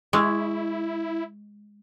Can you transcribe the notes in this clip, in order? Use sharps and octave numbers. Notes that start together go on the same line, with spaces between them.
G#3 E4 C#6 E6 G#6